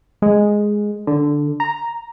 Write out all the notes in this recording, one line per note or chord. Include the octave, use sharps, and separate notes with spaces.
G#3
D3
A#5